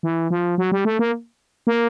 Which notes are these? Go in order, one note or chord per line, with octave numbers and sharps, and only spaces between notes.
E3
F3
F#3
G3
A3
A#3
A#3